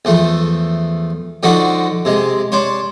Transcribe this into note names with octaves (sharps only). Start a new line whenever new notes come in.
E2 F3 A3
D3 F3 D4 D#4 F#4
C3 G#3
D4 C5 C#5